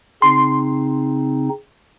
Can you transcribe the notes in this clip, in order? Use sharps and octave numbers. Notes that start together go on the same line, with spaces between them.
C#3 C4 D#4 C6